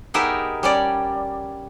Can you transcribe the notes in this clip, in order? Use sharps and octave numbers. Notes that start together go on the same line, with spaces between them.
B3 D#4 G4 G#4 A#4 E5
G3 C#4 D5